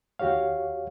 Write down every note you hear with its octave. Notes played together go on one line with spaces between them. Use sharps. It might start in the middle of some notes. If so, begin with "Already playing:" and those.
D#2 F#4 G4 C#5 F5